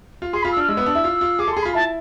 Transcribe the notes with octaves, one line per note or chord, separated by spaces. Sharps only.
F4
G#4 C6
F4 B5
E6
D4 F6
G#3 E6
B3
D4
E4
F4
F4
G#4 D6
A4 C6
G#4
F4 B5
E4 A5